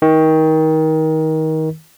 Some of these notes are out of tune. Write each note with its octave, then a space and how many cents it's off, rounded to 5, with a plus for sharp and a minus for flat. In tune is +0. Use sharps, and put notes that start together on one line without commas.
D#3 +25